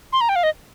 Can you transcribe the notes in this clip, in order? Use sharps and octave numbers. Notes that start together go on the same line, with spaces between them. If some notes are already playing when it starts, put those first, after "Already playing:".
C6
A#5
G5
F5
D#5